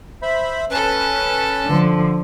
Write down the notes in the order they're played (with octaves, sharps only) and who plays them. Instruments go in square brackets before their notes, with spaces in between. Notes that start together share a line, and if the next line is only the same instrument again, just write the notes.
[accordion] C5 E5 B5
[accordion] C#4 B4 [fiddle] A4 A5
[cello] D3 F3